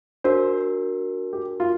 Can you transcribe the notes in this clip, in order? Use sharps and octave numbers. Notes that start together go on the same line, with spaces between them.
D4 F#4 A#4 C5
G4
F4